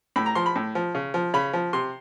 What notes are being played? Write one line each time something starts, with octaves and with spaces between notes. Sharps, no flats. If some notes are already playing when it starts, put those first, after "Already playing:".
A2 B5
A#5
F3 C6
B5
A2
F3
C#3
F3
C#3 B5
F3
C3 C6